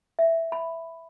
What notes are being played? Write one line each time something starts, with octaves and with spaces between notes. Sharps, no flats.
E5
B5